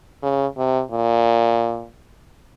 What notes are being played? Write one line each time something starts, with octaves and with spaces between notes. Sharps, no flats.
C#3
C3
A#2